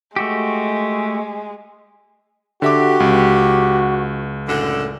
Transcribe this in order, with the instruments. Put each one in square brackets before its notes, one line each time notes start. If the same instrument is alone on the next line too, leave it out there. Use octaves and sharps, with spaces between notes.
[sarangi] G#3 [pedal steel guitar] A3 F#4 G4
[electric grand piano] D3 E5 D6 [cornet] F#4 [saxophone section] G4
[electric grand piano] C#2
[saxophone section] F#2 A2 D3